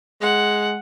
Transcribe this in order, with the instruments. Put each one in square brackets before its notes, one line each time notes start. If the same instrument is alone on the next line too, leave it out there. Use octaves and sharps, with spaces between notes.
[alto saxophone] G#3 [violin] F#5